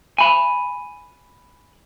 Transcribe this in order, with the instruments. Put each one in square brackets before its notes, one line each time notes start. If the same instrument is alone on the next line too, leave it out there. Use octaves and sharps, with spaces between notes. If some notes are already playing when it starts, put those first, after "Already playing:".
[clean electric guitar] G#5 B5